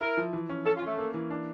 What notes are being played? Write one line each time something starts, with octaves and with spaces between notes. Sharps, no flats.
E4 A#4
F3
E3
C#4
C#4 A4
F4
A3 C#4
A#3
E3
D4